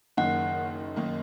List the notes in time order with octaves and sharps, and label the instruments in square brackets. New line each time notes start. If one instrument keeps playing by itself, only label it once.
[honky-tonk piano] F#1 F#2 D#3 A#3 D#4 [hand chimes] F#5
[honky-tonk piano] F#1 F#2 D#3 A#3 D#4